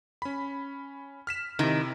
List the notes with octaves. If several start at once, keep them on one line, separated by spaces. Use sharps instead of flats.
C#4 B5
F6 B6 E7
C3 D#3 E4